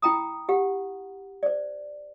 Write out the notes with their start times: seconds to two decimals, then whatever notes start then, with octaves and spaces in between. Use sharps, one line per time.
0.02 E4 G5 A#5 B5 D#6
0.49 G4 F#5
1.43 C5 D5